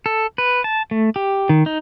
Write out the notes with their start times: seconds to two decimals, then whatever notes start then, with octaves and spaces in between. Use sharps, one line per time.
0.06 A4
0.38 B4
0.64 A5
0.91 A3
1.16 G4
1.49 D#3
1.66 D#4